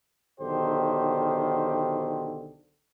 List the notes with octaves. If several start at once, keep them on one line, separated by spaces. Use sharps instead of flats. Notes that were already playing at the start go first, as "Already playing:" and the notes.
B1 D3 D#3 G4 C5